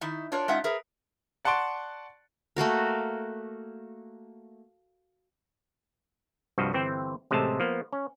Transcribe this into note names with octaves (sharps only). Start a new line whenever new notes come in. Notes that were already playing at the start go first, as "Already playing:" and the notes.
D#3 D#4 E4
D4 F4 A#4 C#5
G#3 C#4 D#4 F4 E5 F#5
G#4 A#4 B4 E5
D5 F#5 A5 C6 C#6 D7
A3 A#3 F#4 A#4
C2 G2 F3 F#4 D#5
G1 E3 C4 C5 G5
A1 C3 G#3 A3 C5 A5
F3 A#3 B3
C#4